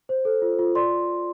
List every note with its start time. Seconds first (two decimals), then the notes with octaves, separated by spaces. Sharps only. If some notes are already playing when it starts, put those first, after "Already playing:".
0.09 C5
0.25 A4
0.42 F4
0.59 F4
0.75 D5 C6